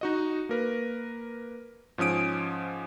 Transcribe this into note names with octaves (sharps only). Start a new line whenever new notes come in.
D#4 F#4 D#5
A#3 A#4 B4
G#2 F3 C#4 D#6 D7